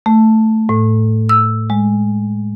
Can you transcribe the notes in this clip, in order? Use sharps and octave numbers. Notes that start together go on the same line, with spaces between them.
A3
A2
E6
G#3